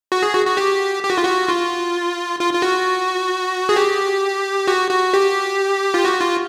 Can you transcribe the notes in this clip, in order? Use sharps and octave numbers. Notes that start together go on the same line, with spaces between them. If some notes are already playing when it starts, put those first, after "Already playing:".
F#4
G#4
F#4
F#4
G4
G4
F#4
F4
F#4
F4
F4
F4
F#4
G#4
G4
F#4
F#4
G4
F4
F#4
F4